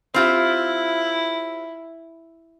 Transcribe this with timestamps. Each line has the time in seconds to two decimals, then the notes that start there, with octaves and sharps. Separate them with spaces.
0.14 C4 E4 F4 G4